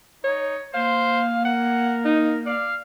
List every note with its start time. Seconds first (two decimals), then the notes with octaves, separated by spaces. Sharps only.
0.24 D#4 C#5
0.74 A#3 C5 F5
1.45 A#4 F#5
2.05 D#4
2.46 D5 F5